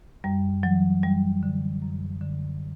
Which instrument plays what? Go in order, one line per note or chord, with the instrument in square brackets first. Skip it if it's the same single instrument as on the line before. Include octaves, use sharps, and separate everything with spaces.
[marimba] F#2 G3
E3 F#3
F#2 G3
D3
F#2
D3